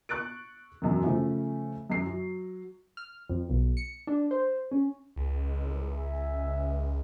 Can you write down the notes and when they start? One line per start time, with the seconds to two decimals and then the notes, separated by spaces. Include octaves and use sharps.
0.09 C#6 F#6 A6 D7
0.82 E1 F#2 F#4
1.04 C#3 F3 A3
1.90 F#2 C7
2.06 F#3
2.97 F6
3.29 F2
3.49 B1
3.77 C#7
4.07 D4
4.31 C5
4.71 C#4
5.16 C#2
5.59 C2
5.91 E5 G#5